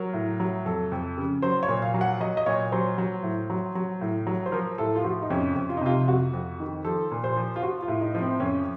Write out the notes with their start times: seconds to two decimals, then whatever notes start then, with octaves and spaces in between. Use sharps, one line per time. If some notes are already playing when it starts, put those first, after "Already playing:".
Already playing: F#3 A#4
0.13 A2
0.40 F#3
0.65 F2 A4
0.92 F2
1.18 C#3
1.42 F#3 C5
1.63 C#5
1.68 A#2
1.82 F5
1.94 F#3
2.01 F#5
2.20 F#3 D#5
2.37 D#5
2.46 A#2 C#5
2.72 F#3 C5
2.98 F#3
3.23 A2
3.50 F#3
3.75 F#3
4.01 A2
4.27 F#3
4.46 C5
4.52 F3 A#4
4.78 A2 A4
4.96 F4
5.04 F3 F#4
5.22 D#4
5.30 F2 C#4
5.56 F2
5.69 F4
5.77 D#4
5.81 C3 F4
6.08 F2 F#4
6.33 F2
6.60 D#3
6.85 F3 A4
7.11 A#2
7.24 C5
7.37 F3
7.56 F4
7.62 F3 F#4
7.82 F4
7.88 A2
8.01 D#4
8.15 F3
8.20 C4
8.40 F2 C#4